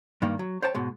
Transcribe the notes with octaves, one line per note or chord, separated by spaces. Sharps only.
G2 D#3 A#3
F#3
C5 C#5 G5 A5
G#2 B2 G#3